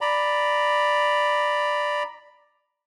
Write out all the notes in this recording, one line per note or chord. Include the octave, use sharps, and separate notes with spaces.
D5 A#5 B5